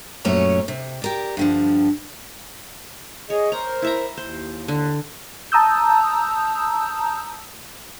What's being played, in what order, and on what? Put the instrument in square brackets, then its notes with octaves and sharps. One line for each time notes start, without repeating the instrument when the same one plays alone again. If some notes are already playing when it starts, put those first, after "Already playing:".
[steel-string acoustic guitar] F#2 A#2 A3 C#4 C#5 A#5
C3
G4 A#4 D5
G2 D3 F3
[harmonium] G#4 D#5 [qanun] C#5
[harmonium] A#4 C5 [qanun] A#5
[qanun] E4 E5 A#5
[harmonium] D#2 [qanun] C5
[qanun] D3
[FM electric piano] A5 A#5 D#6 E6 G6